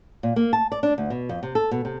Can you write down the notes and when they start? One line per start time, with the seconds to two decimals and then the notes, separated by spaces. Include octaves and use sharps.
0.23 A#2
0.36 A#3
0.53 A5
0.72 D5
0.83 D4
0.98 D2
1.10 B2
1.29 F2
1.43 C3
1.55 A4
1.71 B2
1.85 C3